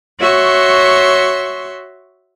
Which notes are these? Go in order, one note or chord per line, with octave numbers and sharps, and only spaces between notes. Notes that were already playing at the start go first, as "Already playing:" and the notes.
F#4 C#5 E5 C6 C#6